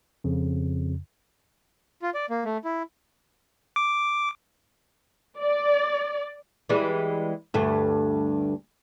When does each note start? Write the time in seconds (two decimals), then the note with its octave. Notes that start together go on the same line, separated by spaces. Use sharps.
0.24 F2 C#3
2.02 F4
2.14 D5
2.30 A#3
2.45 A3
2.64 E4
3.76 D6
5.39 D5
6.69 E3 G3 G#3
7.54 D2 G2 A3